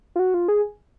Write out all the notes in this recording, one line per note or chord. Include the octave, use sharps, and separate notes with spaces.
F4
F#4
F4
G#4